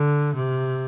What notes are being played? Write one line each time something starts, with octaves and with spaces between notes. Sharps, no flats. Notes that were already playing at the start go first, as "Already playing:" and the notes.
Already playing: D3
C3